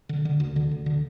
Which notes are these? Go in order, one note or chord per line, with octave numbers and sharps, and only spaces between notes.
D3
D3
D2
D3
D2
D3